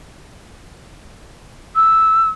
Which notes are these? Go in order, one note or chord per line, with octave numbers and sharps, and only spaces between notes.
E6